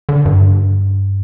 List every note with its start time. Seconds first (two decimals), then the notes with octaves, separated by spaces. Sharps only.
0.09 D3
0.25 G2